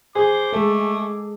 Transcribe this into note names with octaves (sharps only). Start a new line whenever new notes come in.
G#4 C5 D6
G#3 A3 A4